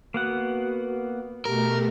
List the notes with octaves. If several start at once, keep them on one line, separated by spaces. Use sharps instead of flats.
A#3 B3 F#4 F#5
B2 A3 G4 A#4